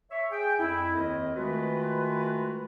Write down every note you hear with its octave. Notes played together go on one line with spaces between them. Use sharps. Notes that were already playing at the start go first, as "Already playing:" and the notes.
C#5 E5
G#4 G5
F2 E4
D#2 D#3 C4 A#4 D#5
D#3 G#3 A3 F4 F#4 B4